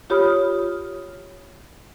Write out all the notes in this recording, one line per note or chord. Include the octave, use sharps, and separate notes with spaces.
F4 G4 C#5 B5 D#6 F6